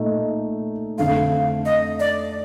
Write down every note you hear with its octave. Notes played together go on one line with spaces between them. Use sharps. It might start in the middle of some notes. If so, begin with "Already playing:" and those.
Already playing: A#2 A3 D#4
F2 D3 A3 F5
D#5
D5